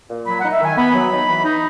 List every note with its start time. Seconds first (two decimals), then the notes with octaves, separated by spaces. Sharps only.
0.09 A#2
0.26 F#3 B5
0.40 F#5
0.44 D#4
0.53 E5
0.61 D#3 G#5
0.77 B3 B5
0.94 F#3
1.11 D#4
1.28 E3
1.44 D#4